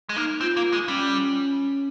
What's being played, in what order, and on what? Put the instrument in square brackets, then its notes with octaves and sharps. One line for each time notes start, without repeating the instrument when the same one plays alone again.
[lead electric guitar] G#3
[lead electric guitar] A#3 [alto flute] D#4
[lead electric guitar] C4 [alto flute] F4
[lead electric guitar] A#3
G#3
[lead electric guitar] G3 [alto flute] C#4